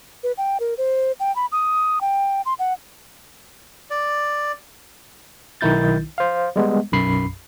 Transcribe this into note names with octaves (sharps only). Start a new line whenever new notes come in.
B4
G5
A#4
C5
G5
B5
D#6
G5
C6
F#5
D5
B1 D#3 D#4 E4 G6 A6
C5 F5
G3 G#3 B3
B1 F#2 B5 C7